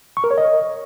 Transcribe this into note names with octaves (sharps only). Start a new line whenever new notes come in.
C#6
A#4
C#5
D#5